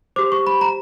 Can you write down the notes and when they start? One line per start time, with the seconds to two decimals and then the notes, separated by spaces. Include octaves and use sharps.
0.16 G4 C5 D6
0.32 C#6
0.47 B5
0.61 A#5